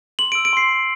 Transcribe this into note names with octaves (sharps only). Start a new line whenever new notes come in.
C6 F#7
D7
E6
D7
C6 C7
C6